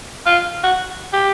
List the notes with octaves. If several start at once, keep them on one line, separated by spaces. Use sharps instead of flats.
F4
F#4
G4